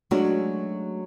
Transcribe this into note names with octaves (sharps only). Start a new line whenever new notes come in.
F#3 G#3 A3 C#4 D4 F#4